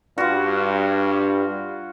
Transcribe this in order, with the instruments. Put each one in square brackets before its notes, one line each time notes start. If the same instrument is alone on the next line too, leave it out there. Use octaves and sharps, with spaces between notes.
[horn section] G2 [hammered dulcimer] F4 F#4